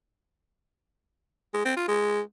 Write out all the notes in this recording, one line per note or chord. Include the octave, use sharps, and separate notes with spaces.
G#3
C4
F4
G#3